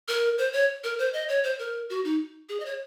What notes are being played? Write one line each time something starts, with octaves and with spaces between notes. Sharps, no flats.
A#4
C5
C#5
A#4
C5
D#5
C#5
C5
A#4
F#4
D#4
G#4
D#5
C#5